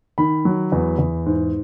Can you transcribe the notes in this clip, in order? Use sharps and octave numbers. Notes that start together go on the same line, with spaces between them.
D#3 B5
F#3
E2
E2
G#2